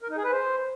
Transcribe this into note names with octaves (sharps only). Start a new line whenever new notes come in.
A#4
D#4
G#4
B4
C5